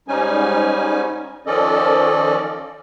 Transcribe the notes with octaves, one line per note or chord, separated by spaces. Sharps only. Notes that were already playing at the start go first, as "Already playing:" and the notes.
G#2 G3 C#4 D#4 G#5
D#3 F3 C#4 A4 D5 D#5